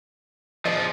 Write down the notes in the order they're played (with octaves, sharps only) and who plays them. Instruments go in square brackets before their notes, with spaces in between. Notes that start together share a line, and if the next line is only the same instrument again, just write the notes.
[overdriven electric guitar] F3 G#4 [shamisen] D5 D#5